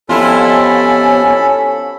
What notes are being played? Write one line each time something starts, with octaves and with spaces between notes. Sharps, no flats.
F2 B3 C#4 E4 F4 G4 A4 B5